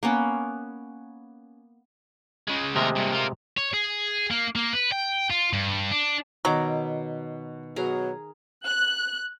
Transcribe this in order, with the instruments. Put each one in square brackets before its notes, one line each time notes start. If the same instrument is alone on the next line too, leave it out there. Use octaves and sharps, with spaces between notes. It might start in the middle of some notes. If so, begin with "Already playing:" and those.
[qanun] A#3 B3 C#4
[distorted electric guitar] C#3 G#3
[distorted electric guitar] D#2 A#4 [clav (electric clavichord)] C3 G#3 A3
[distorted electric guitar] G2 A#2
A#3 F4
C#5
G#4
A#3
A#3
B4
G5
F4
G2
D4
[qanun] B2 D#3 D6 [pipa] F#3
[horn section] B2 F#3 [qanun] G#4 A#4 A#5
[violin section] F#6